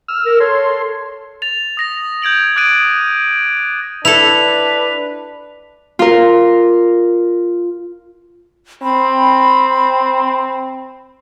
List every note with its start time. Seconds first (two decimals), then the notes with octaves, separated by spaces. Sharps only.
0.08 E6 F6
0.26 A#4
0.40 A4 C#5 C6
1.42 A6 F7
1.77 D#6 A#6 F7
2.22 G6 G#6 D7 F#7
2.56 D6 D#6 F#6 A6 D7 D#7
4.05 D4 E4 A4 B4 F7
5.99 F4 A#4
8.83 C4 B5